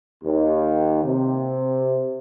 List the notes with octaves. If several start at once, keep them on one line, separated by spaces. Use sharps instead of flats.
D#2
C3